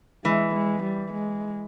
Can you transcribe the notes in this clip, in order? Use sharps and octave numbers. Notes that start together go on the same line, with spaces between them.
E3 G#3
G#3
G3
G#3